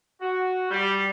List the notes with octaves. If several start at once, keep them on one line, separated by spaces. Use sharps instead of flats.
F#4
G3